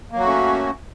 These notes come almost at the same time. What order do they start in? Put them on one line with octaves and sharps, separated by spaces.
A#3 F#3 F#4 A3 C#4